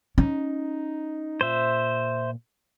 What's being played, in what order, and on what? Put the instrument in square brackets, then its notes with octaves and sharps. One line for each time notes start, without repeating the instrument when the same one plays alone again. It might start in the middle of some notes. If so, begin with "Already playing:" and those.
[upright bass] C#4 [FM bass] D#4
[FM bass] A#2 [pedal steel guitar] C5 E5